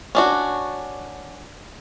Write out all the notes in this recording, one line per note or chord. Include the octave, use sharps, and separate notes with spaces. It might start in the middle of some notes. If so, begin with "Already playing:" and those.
C#4 D4 F#4